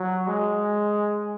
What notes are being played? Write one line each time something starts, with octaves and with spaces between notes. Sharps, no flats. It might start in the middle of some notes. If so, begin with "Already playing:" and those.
Already playing: F#3
G#3